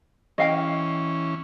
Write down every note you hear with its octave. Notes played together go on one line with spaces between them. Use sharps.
E3 C#4 D#5 F5 G5